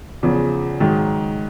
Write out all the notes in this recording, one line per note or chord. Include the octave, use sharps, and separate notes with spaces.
E2 C#3 F3
G#2 D#3 F#3